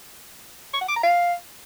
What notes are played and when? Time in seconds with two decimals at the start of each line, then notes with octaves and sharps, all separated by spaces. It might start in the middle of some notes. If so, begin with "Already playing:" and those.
0.74 C#6
0.81 F#5
0.89 D6
0.96 A#5
1.03 F5